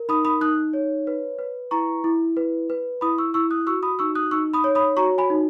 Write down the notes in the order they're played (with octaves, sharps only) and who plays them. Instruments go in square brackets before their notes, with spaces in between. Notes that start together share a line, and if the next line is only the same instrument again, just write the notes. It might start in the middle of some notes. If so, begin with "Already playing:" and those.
Already playing: [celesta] A#4
D#4 B5 D#6
B5 D#6
D#4 D#6 F#6
C#5
B4
B4
E4 A#5 C#6
E4
B4
B4
E4 B5 D#6
C#6 E6
E4 C#6 E6
D#6 F#6
F#4 C#6 E6
B5 D#6
D#4 C#6 E6
D#6 F#6
D#4 C#6 E6
B5 D#6
C#5
B5 D#6
F#4 A#5 C#6
G#5 B5
D#4